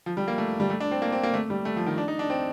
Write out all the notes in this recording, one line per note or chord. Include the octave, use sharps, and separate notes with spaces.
F3
G3
A#3
A3
G3
A3
D4
C4
A#3
C4
A#3
A3
G3
A3
F3
D#3
D4
D#4
D4
C4